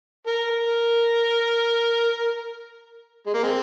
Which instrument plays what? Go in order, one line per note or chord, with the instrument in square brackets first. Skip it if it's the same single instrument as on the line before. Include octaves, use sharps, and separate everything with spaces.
[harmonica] A#4
A#4
G#3
A#3
G#3 C4